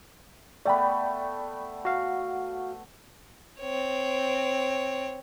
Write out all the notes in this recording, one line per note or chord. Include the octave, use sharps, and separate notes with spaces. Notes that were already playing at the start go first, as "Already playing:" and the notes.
A3 B3 D5 G5 B5
F#4 F5
C4 C#5